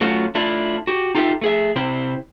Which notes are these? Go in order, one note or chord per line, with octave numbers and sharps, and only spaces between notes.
F#3 A3 C#4 F4 F#4
A3 D4 E4 F4
F#4 G4
D#4 F4 G4 A4 E5
A3 G#4 E5
C3 C4 E4 C5